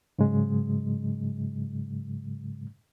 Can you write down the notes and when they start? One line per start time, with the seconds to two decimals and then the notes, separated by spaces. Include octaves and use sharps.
0.19 G#2 C#3 F#3 G#3